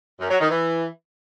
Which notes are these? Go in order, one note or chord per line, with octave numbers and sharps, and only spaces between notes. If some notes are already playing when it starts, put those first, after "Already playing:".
F#2
F#3
D#3
E3